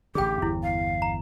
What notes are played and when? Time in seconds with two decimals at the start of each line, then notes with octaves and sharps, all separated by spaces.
0.15 A1 D3 G4 G#4 G5
0.42 G1 E2 E4
0.63 F5
1.02 A#5